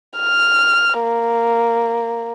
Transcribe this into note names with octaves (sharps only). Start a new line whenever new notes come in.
F6
A#3